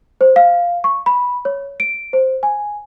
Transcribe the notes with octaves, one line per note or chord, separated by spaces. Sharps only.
C5
F5
C#6
B5
C#5
D7
C5
G#5